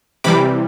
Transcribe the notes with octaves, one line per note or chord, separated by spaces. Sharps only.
C3 E3 G3 B5 D6